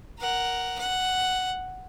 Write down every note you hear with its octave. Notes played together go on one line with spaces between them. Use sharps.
A#4 F#5
F#5